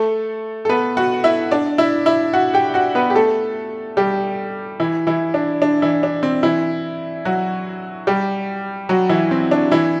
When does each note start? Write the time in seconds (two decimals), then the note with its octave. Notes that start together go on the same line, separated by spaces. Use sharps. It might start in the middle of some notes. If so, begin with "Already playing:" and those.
Already playing: A3 A4
0.65 A4
0.69 B3 B4
0.97 F#4 F#5
1.24 E4 E5
1.51 D4 D5
1.78 E4 E5
2.06 E4 E5
2.33 F#4 F#5
2.54 G4 G5
2.74 F#4 F#5
2.95 B3 B4
3.10 G4
3.15 A3 A4
3.97 G3 G4
4.80 E3 E4
5.07 E3 E4
5.34 D4
5.62 D4
5.82 E3 E4
6.03 D4
6.23 C4
6.43 E3 E4
7.25 F#3 F#4
8.07 G3 G4
8.89 F#3 F#4
9.09 E3 E4
9.31 C4
9.51 D4
9.71 E3 E4